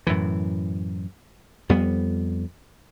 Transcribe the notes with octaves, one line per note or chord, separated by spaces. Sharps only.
F#2 A2 E3
F2 G3 B3